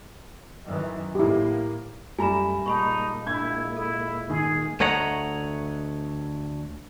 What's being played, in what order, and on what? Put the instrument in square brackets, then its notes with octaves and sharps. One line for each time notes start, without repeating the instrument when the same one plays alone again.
[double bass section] F#2 D#3 E3
[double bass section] A2 A#3 [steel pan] E4 G4
[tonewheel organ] F#2 A3 [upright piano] G3 A#5 [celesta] G#5 B5 E7
[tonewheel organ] A#2 G#3 A#3 [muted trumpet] D#4 [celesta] A5 B5 C#6
[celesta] D4 [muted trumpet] E4 [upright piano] G6 G#6
[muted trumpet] E4 [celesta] A4
[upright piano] D#3 [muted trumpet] G#4
[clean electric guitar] D2 A3 C#5 D#5 F#5 A#5